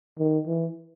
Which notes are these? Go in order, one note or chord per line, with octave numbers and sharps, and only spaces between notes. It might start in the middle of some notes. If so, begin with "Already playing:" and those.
D#3
E3